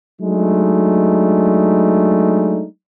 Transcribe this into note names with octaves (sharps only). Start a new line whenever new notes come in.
F#3 G#3 A3 D4 D#4